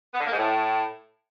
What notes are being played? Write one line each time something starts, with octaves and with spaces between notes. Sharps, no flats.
B3
D3
A#3
G#2
A2